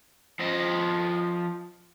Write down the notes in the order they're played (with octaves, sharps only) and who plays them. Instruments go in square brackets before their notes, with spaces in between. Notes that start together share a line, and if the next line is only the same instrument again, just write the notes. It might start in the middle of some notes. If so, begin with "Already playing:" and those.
[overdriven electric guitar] F3 D#5